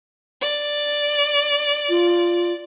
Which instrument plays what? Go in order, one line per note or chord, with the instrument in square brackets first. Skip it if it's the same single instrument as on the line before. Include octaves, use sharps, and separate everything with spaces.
[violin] D5
[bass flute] F4